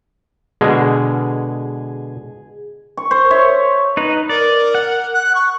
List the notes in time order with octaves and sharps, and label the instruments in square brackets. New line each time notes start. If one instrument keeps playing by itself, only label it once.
[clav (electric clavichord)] B2 D3 G#3 [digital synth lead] G#4
[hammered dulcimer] C#6
C5
C#5 E5
[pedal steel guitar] D#4 B4
[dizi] A#4 [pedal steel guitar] D5
[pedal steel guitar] F#5
[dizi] F#6
C#6